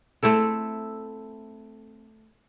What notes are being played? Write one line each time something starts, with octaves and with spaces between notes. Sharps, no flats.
A3 C4 E4 A4